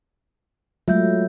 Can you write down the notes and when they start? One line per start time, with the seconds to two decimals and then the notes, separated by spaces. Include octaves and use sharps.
0.88 F#3 G#3 A3 F4 E5 G6